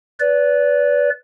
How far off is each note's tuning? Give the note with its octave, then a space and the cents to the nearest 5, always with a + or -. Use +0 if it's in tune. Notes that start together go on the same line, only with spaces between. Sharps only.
B4 +0 D5 -30